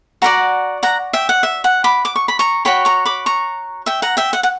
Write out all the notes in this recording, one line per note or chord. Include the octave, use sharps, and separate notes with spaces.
F#4 A#4 D5 F#5 A#5
F#5 A#5
E5 G5
F#5
E5
F#5
B5 D6
D6
C#6
B5
A#5 C#6
F#4 C#5 G5 B5
A#5 C#6
B5 D6
A#5 C#6
E5 G5
F#5 A#5
E5 G5
F#5
F#5